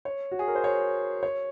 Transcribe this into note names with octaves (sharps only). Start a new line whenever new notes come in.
C#5
F#4
G#4
A#4
C5
C#5
C#5